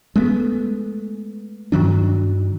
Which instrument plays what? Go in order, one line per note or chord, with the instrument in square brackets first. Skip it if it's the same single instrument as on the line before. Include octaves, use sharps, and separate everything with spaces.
[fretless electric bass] G#3 A3 B3
G2 D#3 F#3 D4